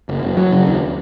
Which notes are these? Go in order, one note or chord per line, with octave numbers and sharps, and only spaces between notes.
F#1
F#1
F#3
C#3
D#2